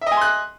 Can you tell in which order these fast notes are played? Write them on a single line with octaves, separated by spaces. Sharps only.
E5 D#5 G#5 C6 F#6